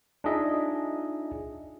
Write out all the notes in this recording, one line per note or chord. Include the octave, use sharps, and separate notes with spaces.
D4 D#4 F4 G#4 D#5 E5